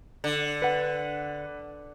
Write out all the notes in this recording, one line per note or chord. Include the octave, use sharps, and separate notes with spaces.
D3
B4 F#5